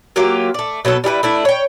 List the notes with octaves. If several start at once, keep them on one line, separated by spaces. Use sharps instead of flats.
F#3 A#3 F4 G4
A3 D5
B2 F#3 B3 A4
G3 E4 G#4 B4
A3 D4 E4
C#5 G5